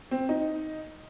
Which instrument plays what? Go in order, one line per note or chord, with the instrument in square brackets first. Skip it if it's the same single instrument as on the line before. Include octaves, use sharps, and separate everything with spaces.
[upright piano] C4
D#4